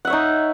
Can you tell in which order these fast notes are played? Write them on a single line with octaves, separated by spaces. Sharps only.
F#5 E5 C#5 D#4